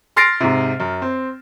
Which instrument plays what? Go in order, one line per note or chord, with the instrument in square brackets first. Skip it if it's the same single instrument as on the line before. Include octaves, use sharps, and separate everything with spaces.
[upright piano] C6 F6 A6 A#6 C7 D7
G#2 C3
F#2
C4